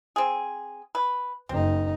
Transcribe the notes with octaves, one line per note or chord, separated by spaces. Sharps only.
C4 G#4
B4
F#1 C4 D#4